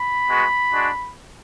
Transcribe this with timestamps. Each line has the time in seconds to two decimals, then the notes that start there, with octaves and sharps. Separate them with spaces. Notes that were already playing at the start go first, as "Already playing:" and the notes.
Already playing: B5
0.28 G#3 B3 F#4
0.71 G#3 D4 F#4